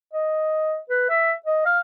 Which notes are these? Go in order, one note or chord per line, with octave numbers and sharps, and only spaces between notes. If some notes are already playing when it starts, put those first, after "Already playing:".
D#5
B4
E5
D#5
F5